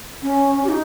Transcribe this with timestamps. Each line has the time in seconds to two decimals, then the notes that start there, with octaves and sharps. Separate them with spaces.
0.22 C#4
0.64 G4
0.69 D#4